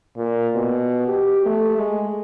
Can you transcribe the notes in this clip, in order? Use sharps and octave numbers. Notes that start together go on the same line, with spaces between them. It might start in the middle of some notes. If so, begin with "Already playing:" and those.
A#2
B2
G4
A3
G#3